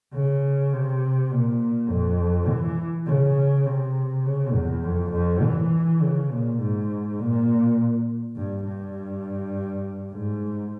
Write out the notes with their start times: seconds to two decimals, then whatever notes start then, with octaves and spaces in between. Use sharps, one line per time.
0.14 C#3
0.73 C3
1.32 A#2
1.89 F2
2.49 E3
3.07 C#3
3.66 C3
4.25 C#3
4.54 E2
4.84 F2
5.13 F2
5.43 E3
6.01 C#3
6.31 A#2
6.60 G#2
7.19 A#2
8.36 G2
8.65 G2
10.12 G#2